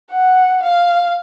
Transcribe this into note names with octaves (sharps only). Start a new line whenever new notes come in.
F#5
F5